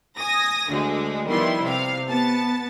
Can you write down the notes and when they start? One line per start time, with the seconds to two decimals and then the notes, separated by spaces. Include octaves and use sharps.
0.17 G#5 D#6 A#6
0.69 D2 D3 G#3
1.27 D#3 F3 G3 B3 E4 C6
1.61 C3 F5
2.09 B3 A5 A6